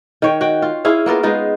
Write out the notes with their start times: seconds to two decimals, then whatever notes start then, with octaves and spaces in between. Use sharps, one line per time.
0.22 D#3 C#5 G5
0.41 F#4 G5
0.62 F4
0.85 C#4 E4 G#4 F5
1.06 A#3 B3 F4 A#4
1.23 G#3 B3 D#4 F4